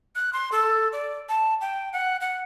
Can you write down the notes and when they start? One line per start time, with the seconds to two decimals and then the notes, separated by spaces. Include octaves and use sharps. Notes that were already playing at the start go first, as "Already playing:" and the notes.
0.16 F#6
0.33 C6
0.52 A4
0.93 D5
1.29 A5
1.61 G5
1.93 F#5
2.21 F#5